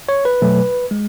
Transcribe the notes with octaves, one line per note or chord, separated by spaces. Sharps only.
C#5
B4
B2 F#3 A3
G#3